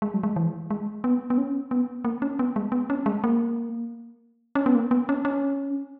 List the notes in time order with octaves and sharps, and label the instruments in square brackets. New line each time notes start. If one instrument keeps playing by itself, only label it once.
[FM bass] G#3
F#3
G#3
E3
G#3
B3
B3
C#4
B3
A#3
C#4
B3
G#3
B3
C#4
G#3
A#3
C#4
B3
A#3
B3
C#4
C#4